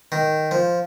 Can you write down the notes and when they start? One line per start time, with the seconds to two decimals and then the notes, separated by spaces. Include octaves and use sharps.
0.12 D#3
0.51 F3